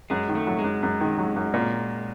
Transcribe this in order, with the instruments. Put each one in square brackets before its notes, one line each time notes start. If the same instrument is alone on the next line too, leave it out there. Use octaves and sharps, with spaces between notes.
[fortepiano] F#2 [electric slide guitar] G#3
[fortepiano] D#3
[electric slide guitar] A3
[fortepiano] F#3
[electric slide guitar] G#3
[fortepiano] F#2
F#2
D#3
F#3
F#2
A#2